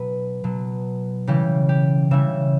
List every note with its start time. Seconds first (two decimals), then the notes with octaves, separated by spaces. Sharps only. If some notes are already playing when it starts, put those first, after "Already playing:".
Already playing: B2 F#3 B4
0.44 B2 F#3
1.27 C#3 E3 G3 G4
1.69 G4
2.11 C#3 E3 G3 E5